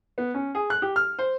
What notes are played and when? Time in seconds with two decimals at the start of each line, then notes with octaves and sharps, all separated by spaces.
0.18 B3
0.34 C#4
0.55 G#4
0.70 F#6
0.82 G4
0.96 F6
1.19 C5